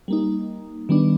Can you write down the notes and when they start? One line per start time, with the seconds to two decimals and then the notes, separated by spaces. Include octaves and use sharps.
0.08 G3 A#3 D#4
0.89 D#3 G3 B3 D4